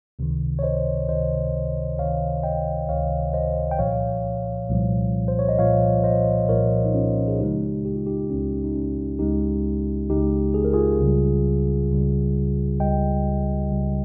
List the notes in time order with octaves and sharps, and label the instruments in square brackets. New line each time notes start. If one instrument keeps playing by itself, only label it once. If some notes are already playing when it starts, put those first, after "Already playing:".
[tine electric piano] C#2 C3 D#3
C#5
C5 D#5
C#2 C3 D#3 C5 D#5
C#2 C3 D#3 C#5 F5
D#5 G5
C#2 C3 D#3 C#5 F5
C5 D#5
G5
C2 A#2 F3 C#5 F5
C2 A#2 F3
C5
C#5
D#5
C2 A#2 F3 C#5 F5
C5 D#5
C2 A#2 F3 A#4 C#5
D#4
C#4 F4
G#4
C#2 C#3 G#3 D#4 G4
G4
F4
D#4 G4
C#2 C#3 G#3 C#4
D#4
C#4
C#2 C#3 G#3 D#4 G4
C#2 C#3 G#3 D#4 G4
G#4
A#4
F4 G#4
C#2 C#3 G3
C#2 C#3 G3
C#2 C#3 G3 D#5 G5
C#2 C#3 G3